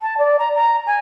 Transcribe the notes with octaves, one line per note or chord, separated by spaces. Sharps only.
A5
D5
A#5
A#5
G#5